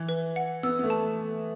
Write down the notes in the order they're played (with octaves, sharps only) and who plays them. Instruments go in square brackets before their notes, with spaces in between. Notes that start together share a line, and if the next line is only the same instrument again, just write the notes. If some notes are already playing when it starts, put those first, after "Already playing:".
Already playing: [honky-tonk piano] E3
[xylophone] B4
F#5
[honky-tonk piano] B3 [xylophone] E6
[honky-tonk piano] B3
A3
[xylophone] A5